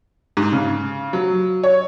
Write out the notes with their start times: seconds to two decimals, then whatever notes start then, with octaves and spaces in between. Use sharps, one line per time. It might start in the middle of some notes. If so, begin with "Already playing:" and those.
0.37 G#2
0.53 C#3
1.13 F#3
1.63 C#5